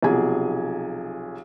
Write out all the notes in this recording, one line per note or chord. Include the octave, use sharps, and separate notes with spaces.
B1 C3 F3 G#4 G#5